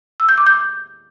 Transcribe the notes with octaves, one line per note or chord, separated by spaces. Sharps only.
E6
G6
D6
G6